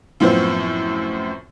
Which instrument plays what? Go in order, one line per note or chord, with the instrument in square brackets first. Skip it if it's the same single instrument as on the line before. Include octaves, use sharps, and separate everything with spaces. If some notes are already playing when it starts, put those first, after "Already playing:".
[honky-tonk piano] F#2 A2 F3 B3 C4